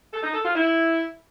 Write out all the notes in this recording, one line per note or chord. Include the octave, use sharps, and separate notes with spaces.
A4
D#4
A4
F4
E4